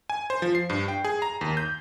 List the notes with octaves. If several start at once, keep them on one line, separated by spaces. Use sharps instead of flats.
G#5
C5
F3
C7
G2
G5
G#4
A#5
D#2
G6